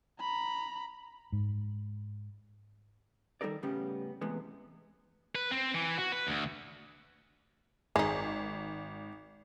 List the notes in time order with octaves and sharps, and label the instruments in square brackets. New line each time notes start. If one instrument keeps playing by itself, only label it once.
[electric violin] A#5 B5
[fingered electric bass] G#2
[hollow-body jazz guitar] D#3 G3 D#4 A4 A#4 D5
A2 C#3 G3 B3 C#4 G4
E2 A2 C3 G#3 B3
[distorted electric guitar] B4
C4
E3
F#4
B4
D2
[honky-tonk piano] G#1 [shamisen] G#3 D#4